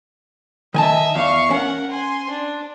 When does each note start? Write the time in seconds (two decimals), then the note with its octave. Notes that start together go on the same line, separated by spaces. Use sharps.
0.74 D#3 D#5 E5 G#5 A5
1.15 E2 F5 C#6
1.51 C#4 A#4 F#5
1.90 G#5 C6
2.29 D4